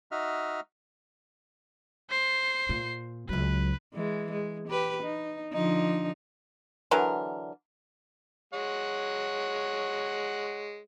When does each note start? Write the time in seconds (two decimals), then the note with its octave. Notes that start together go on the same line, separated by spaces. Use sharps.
0.11 D#4 F#4 D#5 E5 F6
2.10 C5 C7
2.69 A#2
3.29 C#2 F#3 B4
3.94 E3 G#3
4.32 G#3
4.68 G4 B4
5.03 D#4
5.53 D3 F3 D#4
6.91 D3 E3 F#3 A#4
8.54 G#3 C#5 F#5